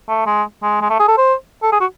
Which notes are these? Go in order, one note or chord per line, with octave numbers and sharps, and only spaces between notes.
A3
G#3
G#3
G#3
A3
G#4
A4
C5
A4
G#4
F#4